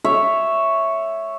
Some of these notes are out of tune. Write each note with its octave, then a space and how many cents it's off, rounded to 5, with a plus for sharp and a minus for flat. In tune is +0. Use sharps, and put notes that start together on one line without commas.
C#5 +0 E5 +0